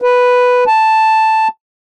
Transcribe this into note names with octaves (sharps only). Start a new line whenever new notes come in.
B4
A5